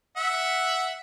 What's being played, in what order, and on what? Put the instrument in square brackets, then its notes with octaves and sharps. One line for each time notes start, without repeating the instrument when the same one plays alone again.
[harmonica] E5 F#5